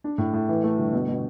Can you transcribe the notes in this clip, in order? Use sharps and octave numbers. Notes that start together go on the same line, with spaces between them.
D4
A2
A2
E3
A3
G1
B2
B2